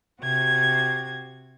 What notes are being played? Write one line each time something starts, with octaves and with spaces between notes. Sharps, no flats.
C3 F#4 G#6